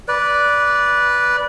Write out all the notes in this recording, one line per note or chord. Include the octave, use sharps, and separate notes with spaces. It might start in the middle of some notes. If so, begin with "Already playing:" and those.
B4 D5